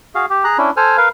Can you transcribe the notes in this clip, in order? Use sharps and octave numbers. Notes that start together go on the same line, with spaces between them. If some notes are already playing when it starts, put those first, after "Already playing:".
F#4 G#4 F5
G4
G#4 A#5 F#6
C#4 D4 E4
A4 C5 G#5 F6
A#4 B4 F5